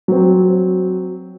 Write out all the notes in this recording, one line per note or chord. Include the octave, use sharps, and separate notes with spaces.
F#3 C4